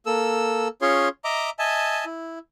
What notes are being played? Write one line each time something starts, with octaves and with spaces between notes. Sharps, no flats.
A#3 A4 E6
C#4 F4 G#4 C#5 C6
D#5 E5 A#5 D6
D#5 E5 G#5 A5
E4